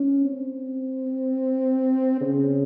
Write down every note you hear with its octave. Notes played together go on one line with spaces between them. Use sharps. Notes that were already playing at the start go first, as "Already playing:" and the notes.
Already playing: C#4
C4
C#3